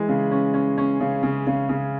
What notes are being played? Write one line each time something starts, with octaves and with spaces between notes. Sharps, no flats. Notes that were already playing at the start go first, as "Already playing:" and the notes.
Already playing: E3 G#3
C#3
C#4
C#4
C#4
C#3
C#3
C#3
C#3